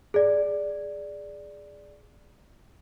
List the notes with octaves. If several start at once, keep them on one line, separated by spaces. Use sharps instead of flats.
G#4 D5